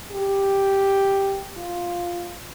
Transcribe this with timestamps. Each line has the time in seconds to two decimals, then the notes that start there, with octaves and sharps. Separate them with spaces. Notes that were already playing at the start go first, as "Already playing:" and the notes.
0.11 G4
1.57 F4